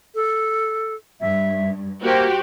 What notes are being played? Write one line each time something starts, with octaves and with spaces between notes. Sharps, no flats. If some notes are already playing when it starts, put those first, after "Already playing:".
A4
G2 E5
A#3 F#4 G4 C5